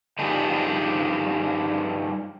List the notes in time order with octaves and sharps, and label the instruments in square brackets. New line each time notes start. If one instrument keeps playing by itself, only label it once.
[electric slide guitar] G2 F3 D4 D#4 G4 G#4